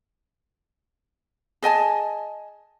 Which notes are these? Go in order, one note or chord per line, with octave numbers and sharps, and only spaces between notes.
G#4 D#5 G#5 A5